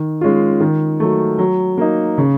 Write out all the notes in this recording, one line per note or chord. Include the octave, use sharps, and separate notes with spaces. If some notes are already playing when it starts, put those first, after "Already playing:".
Already playing: D#3
G#3 C#4 F4
D#3
F#3 A3
F#3
A#3 D#4
C#3